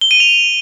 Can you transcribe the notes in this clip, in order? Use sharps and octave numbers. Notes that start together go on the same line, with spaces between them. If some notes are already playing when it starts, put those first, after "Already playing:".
G7
D#7
F7